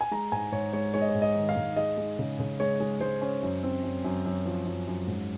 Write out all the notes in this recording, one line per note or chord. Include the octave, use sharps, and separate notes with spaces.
G#5
G#3 A#5
G#2 G#5
G#2 C#5
G#3 C#5
G#3 C#5
D#5
C#5
G#2
D#5
D#3
F5
G#2
G#3 D#5
G#3
C#3
C#3
G#3 C#5
G#3
G#3 C5
C#4
F#2
C4
F#2
F#2
F#2
F3
F#2
F#2
G#2